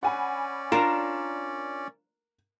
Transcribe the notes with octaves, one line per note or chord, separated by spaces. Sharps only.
C#4 D5 F#5 G#5 B5
D4 F4 A#4 E7